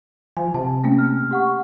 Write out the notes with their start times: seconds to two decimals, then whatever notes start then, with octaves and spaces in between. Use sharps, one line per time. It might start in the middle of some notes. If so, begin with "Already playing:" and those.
0.37 F3 G#5
0.54 C3 A5
0.84 A3 A#3 C#4
0.98 F6
1.31 G4 F#5 C#6